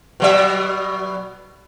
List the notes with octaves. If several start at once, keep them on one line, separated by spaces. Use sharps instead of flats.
B2 F#3 E5